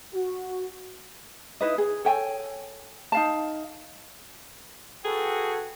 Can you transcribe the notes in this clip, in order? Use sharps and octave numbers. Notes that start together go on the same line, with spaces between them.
F#4
D#4 E4 B4 D#5
G#4
A4 C#5 G5 G#5
D#4 F5 A5
F#4 G#4 A4 B4 G5